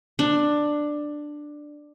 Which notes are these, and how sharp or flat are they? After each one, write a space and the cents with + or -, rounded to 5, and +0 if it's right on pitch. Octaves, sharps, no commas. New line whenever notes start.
D4 +10